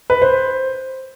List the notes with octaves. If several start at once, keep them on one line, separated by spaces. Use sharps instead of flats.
B4
C5